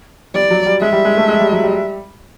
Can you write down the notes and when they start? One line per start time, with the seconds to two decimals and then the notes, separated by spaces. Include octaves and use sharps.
0.34 G3 D5
0.50 F#3
0.66 G3
0.81 G#3 E5
0.93 G3
1.05 G#3
1.17 A3
1.28 G#3
1.40 G3
1.52 F#3
1.64 G3